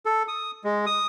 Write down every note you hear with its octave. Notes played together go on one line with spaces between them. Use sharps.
A4
D#6
G#3
D#6